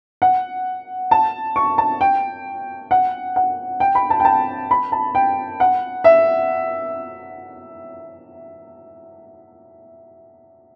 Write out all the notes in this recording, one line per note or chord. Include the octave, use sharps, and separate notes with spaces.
F#5
A5
C#6
A5
G5
F#5
F#5
G5
B5
A5
G5
A5
B5
A5
G5
F#5
E5